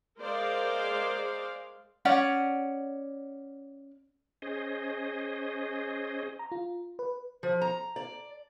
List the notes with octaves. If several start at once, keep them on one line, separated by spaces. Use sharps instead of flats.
G#3 G#4 A#4 C5 D5 F5
C#4 D5 F#5
C#4 G#4 C5 D#5
A#5
F4
B4
F3
A#5
D5